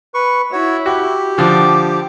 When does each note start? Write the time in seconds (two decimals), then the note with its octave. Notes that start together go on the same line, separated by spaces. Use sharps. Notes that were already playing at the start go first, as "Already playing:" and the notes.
0.14 B4 C#6
0.52 E4 F#4 C#5
0.86 F#4 G4
1.38 D3 F3 D6